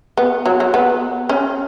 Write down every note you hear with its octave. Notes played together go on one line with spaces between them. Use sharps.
B3
F#3
F#3
B3
C#4